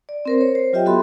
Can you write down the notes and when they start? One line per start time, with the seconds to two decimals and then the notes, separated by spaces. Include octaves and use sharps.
0.09 D5
0.26 C4 A#4 C5
0.41 C#5
0.55 C5
0.73 F#3 F4 G4 D#5 E5 G5
0.86 B3 F#4 A4 E5 B5 C6